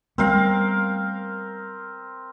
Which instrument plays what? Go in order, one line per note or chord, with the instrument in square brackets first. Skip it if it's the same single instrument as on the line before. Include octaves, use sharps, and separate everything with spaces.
[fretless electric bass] G3 A3 B3 [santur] C4 A#4 F5